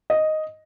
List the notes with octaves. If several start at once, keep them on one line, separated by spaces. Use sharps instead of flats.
D#5